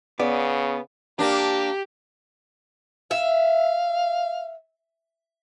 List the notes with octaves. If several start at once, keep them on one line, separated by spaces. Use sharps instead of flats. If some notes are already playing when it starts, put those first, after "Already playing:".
C#3 B3 D5
A#3 D4 G4
E5 F5